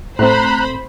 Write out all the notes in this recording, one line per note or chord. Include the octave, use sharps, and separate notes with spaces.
A2 A3 C4 C5 A#5 B5 F#6